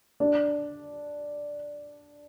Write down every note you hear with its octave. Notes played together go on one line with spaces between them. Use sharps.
D4